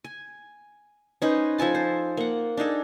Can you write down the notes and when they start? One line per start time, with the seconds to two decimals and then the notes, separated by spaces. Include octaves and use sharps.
0.04 G#5
1.22 C#4 D#4 B4 C5
1.58 F3 A4 G#5 A5
1.75 C5
2.17 A#3 F#5
2.57 D4 D#4 G#4 A4